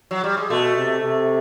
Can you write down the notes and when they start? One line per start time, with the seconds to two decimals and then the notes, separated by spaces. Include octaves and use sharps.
0.11 F#3
0.24 G3
0.37 G#3
0.50 B2 A3
0.76 C3
1.02 C3